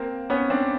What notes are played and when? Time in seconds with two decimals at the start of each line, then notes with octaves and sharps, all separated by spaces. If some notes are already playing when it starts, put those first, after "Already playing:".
Already playing: A#3 C4
0.30 B3 C#4
0.50 C4 D4